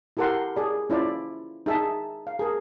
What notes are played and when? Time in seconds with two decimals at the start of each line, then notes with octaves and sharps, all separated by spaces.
0.17 E4 G4 A4 A#4 F#5 C6
0.56 G#4 D5 B5
0.90 C#4 E4 F4 D5
1.66 D#4 G#4 E5 G#5 A5
2.27 F5
2.39 G#4 A#4